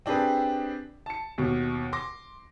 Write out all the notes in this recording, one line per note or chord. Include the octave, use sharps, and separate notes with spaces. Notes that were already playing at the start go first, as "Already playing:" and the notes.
C4 D4 G4 G#4 B4
A5 C#7
D#2 B2
C6 D6 A#6